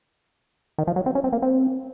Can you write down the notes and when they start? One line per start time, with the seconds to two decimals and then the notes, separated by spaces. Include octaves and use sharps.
0.78 D#3
0.87 F3
0.96 F#3
1.06 C4
1.15 C#4
1.24 C4
1.33 A#3
1.42 C4